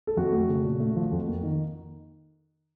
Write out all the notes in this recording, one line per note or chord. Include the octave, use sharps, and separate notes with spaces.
A4
F2 F#4
A3
C#3
A#2
A3
F3
F2
A#3
D#3